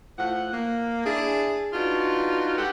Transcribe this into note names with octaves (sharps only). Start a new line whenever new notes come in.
A2 F3 F#5
A#3
D4 E4 G#4
D4 D#4 F4 F#4 B4
G#3 G4 A4 F#5